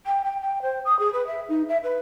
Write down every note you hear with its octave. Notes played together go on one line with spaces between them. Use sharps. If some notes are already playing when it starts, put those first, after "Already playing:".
G5
G5
G5
C5
D#6
G#4
B4
E5
D#4
E5
B4